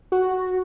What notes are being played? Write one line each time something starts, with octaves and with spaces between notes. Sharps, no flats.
F#4